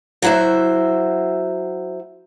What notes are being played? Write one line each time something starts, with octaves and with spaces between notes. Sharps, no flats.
F#3 E4 F#4 C5 E5